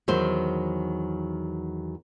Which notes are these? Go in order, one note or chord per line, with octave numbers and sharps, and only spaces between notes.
E2 D#3 F#3 C5